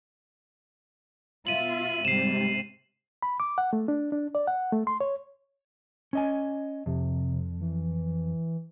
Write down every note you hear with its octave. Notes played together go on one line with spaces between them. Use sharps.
B2 F4 E5 D#7 F#7
G#2 C3 G3 C7 E7
B5
D6
F#5
A3
D4
D4
D5
F#5
A3
C6
C#5
C#4 D#5 G#5
F2 C3
E3